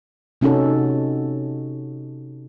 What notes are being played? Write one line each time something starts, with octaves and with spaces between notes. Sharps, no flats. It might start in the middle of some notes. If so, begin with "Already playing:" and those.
C3 C#4 D#4 F#4 A4